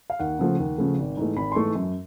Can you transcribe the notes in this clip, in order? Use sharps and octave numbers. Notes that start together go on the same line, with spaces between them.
F5
D#2 F#5
C#3 F3 A3
D#2
C#3 F3 A3
G#1
G#2 E3 A3
G#1 B5
C6
G#2 E3 A3 C#6
F#2